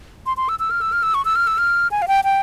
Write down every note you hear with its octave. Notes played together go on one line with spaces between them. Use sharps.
C6
C6
E6
E6
F6
E6
F6
E6
C#6
E6
F6
E6
F6
G#5
F5
G5
G5